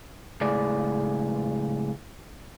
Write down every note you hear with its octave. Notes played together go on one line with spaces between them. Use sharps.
C#2 A2 G#4 D5